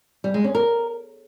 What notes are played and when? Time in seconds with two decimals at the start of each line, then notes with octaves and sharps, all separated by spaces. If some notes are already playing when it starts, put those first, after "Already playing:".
0.24 G3
0.34 G#3
0.44 C#4
0.55 A#4